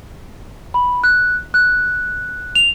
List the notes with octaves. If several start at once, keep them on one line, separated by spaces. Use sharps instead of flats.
B5
F#6
F#6
F7